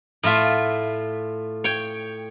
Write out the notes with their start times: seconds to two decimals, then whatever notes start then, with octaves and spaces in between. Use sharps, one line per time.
0.23 A2 A3 F4 E5
1.64 C#5 G5